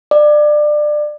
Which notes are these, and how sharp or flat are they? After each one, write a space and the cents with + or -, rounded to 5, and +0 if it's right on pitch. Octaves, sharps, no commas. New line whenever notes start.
D5 +25